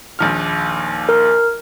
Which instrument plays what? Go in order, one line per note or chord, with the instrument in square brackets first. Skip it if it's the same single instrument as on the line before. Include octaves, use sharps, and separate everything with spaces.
[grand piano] A#1 D#2 F6
[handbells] A#4